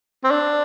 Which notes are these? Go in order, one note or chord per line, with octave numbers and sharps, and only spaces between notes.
C4
D4